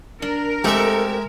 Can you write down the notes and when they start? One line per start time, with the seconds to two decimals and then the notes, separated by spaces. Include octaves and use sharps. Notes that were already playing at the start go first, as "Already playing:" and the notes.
0.22 D4 A#4
0.64 G#3 A3 C4 G4 A4 E5